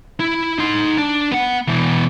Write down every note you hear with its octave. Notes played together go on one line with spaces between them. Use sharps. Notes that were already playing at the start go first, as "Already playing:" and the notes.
E4
D#4 C6
D4
B3 F#5
B2 E3